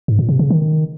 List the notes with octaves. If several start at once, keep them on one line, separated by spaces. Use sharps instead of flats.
G#2
A#2
C3
C#3
D#3